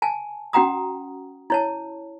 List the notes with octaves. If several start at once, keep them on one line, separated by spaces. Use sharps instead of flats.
G#5 A5
C#4 F#4 F#5 G5 A#5 D#6
E4 C#5 A5